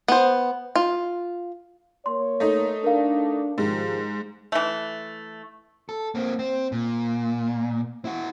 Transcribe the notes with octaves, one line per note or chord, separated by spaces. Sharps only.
B3 C5
F4
A#3 C#5 C6
A3 D#4
D4 A#4 F5
G#2 D#3 F3 G4
E3 A3
A4
A#3 C4
C4
A#2
E4 F#4